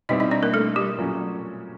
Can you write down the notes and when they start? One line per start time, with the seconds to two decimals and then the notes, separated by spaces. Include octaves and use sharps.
0.09 B2 G3 C4 D#4 E4 D#5
0.20 D#4 D#5
0.31 D4 D5
0.43 A#3 A#4
0.54 A3 A4
0.76 G3 G4
0.98 A#2 F#3 A3 C#4